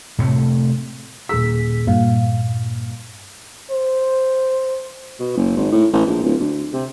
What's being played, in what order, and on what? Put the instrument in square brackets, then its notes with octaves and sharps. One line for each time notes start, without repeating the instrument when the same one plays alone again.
[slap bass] A2 C3 A3
[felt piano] D#1 G#4 E6 [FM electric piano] B6
[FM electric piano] G2 A#2 [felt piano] F5
[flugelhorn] C5
[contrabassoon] B2
F#1
G#1
A2
A1
A#1
D1
D2
C3